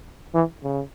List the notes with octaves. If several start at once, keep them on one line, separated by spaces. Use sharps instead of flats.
E3
C#3